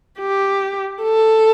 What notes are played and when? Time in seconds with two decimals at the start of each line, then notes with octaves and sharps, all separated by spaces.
0.20 G4
1.02 A4